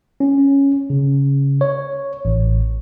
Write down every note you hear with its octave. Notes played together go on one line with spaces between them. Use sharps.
C#4
C#3
C#5
A1